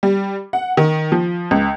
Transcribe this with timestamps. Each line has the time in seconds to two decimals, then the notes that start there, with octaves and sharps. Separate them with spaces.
0.03 G3
0.53 F#5
0.77 D#3
1.12 F3
1.51 C#2